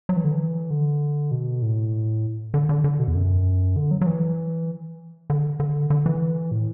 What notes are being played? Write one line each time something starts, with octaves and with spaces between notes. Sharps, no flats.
F#3
E3
D3
E3
D3
B2
A2
D3
D3
D3
B2
E2
F#2
D3
F#3
F#3
E3
D3
D3
D3
E3
A2